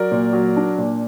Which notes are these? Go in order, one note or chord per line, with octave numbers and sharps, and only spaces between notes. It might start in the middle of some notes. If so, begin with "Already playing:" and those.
Already playing: F#3 A#4 D5
A#2
F#3
D4
A#2